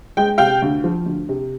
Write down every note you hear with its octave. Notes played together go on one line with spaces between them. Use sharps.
G#3 G5
C3 F5 G5
D2
F3
D2
C3